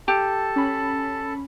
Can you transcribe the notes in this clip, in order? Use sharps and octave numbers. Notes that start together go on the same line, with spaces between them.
G4 A4 A5
C#4 B5